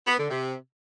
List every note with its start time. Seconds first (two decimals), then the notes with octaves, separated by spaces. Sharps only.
0.06 B3
0.18 D3
0.30 C3